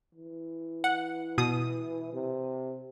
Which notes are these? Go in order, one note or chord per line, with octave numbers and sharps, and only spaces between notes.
E3
F#5
B2 D#6
C3